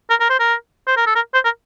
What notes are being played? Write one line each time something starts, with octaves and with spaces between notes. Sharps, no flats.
A#4
A#4
C5
A#4
C5
A#4
A4
A#4
C5
A#4